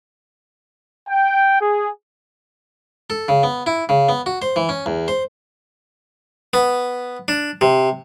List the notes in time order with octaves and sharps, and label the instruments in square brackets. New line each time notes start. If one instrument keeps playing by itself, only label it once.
[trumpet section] G5
G#4
[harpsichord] A4
C#3
B3
E4
C#3
B3
F#4
C5
E3
C#4
E2
C5
B3
D4
C3